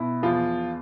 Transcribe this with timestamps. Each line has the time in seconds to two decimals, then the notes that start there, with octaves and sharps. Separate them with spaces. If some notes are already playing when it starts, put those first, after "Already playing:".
Already playing: B2 E4
0.22 E2 F3 F4